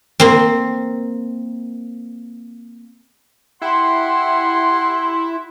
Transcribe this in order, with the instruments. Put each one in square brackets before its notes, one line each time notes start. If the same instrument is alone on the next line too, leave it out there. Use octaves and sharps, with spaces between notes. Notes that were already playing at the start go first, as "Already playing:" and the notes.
[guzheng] A#3 C4
[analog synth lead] E4 [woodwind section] G4 F#5 C6